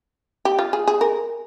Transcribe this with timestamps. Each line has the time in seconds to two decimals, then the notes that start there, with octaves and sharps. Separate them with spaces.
0.45 G4
0.59 F4
0.73 G#4
0.87 G#4
1.01 A#4